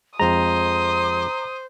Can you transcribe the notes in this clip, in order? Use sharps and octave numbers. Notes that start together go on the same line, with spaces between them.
F2 G#3 C5 A#5 D#6